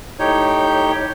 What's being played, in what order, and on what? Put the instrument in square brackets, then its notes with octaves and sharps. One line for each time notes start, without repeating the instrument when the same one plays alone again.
[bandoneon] A2 D#4 G4 C#5 G6